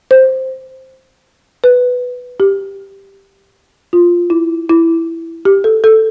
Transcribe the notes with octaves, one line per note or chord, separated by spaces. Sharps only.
C5
B4
G4
F4
E4
E4
G4
A4
A4